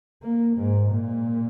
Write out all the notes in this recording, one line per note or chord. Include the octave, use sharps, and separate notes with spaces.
A#3
G#2
A#2